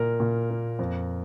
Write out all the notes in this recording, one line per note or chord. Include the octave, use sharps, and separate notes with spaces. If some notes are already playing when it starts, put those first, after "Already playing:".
Already playing: A#2 A#3 A#4
A#2
A#3
F2